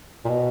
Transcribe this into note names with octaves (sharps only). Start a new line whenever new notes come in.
A#2
B2